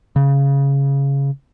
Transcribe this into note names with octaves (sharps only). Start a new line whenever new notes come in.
C#3